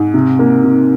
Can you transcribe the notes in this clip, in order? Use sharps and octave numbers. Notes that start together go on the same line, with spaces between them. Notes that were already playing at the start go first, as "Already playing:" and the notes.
Already playing: G#2
C3
A#3
C3